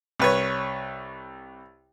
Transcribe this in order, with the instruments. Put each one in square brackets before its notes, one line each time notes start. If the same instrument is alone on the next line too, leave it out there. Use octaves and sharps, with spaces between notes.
[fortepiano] C2 B4 C#5